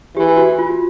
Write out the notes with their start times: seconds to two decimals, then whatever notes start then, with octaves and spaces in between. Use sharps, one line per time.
0.16 E3 G4
0.37 F#4
0.59 F4